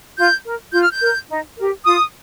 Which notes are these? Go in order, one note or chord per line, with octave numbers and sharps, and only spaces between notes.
F4 G6
A#4
F4 G6
F6
G6
A#4
D#4
G4 A#4
F4 D#6